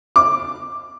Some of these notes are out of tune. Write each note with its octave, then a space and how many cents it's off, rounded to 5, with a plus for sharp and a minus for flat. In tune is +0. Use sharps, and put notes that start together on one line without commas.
D6 +5